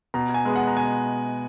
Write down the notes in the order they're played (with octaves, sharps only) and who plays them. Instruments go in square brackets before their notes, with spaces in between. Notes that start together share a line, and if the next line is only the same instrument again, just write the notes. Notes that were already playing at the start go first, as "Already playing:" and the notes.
[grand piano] B2 A#5
G#5
G#3 B3
F#5
A#5
B2 G#5